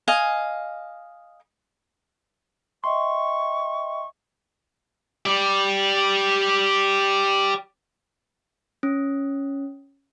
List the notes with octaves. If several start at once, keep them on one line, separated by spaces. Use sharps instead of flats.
D#5 F5 G#5
D#5 E5 G5 C6 C#6
G4 D5
C#4